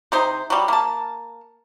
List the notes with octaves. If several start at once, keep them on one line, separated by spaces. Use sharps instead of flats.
C3 D#4 C5
F#3 G3
A#3 A5